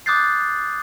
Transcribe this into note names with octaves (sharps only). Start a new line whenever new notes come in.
D6 D#6 F#6 G6 A6 C7